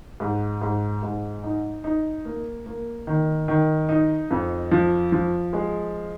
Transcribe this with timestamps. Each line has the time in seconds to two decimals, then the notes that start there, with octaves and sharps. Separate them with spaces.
0.20 G#2
0.62 G#2
1.03 G#2
1.43 D#4
1.84 D#4
2.25 A#3
2.66 A#3
3.07 D#3
3.48 D#3
3.89 D#4
4.31 F2
4.71 F3
5.12 F3
5.53 G#3